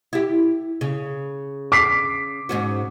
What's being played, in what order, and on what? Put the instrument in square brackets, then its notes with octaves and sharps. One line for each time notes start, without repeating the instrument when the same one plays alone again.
[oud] E4 G4
C#3
[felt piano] D6 B6 C7
[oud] G#2 C#4 F#4